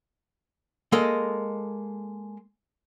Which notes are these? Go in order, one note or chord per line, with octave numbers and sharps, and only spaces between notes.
G#3 A#3 A4 D#5